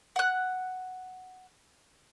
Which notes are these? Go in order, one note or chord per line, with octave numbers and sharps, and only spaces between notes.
F#5 F#6